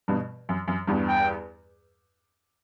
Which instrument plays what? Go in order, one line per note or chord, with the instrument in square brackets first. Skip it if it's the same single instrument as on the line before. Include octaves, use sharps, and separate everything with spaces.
[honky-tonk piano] G2 B2
F#2
F#2
E2 G2
[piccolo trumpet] G5